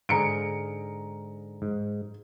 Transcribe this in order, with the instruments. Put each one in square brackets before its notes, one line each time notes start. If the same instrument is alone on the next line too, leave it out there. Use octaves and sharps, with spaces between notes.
[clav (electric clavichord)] G#2 D3 G#4 [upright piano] A#5 C#7 D7
[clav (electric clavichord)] G#2